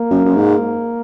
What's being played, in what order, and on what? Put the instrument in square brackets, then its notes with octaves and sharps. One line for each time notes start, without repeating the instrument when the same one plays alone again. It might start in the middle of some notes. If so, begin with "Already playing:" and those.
Already playing: [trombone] A#3
[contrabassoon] F#2
F#2
G#2